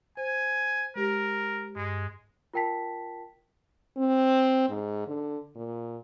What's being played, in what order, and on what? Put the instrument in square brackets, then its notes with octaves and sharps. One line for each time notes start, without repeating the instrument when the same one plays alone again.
[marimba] C5 [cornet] G#5
[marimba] G#3 G4 [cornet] A#4
[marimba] G2 [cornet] G#3
[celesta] F4 A#4 G5 A5 B6
[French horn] C4
G#2
D3
A#2